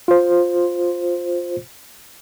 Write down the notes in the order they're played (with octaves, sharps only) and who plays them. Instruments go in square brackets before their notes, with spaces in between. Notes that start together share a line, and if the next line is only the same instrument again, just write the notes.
[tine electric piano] F4 C5